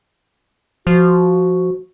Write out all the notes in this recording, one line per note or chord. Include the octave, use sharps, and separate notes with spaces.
F3 F#4